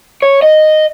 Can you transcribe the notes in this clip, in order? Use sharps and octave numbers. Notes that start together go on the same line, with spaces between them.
C#5
D#5